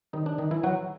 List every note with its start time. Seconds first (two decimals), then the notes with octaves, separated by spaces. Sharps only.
0.13 D#3 G3 C4 D#4
0.26 D4
0.38 D#3 D#4
0.51 E3 E4
0.64 F#3 F#4